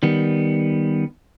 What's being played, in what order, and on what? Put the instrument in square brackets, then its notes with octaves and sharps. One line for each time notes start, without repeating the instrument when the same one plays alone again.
[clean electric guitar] D#3 G3 B3